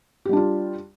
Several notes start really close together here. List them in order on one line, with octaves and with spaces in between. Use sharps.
G4 G3 D4 F4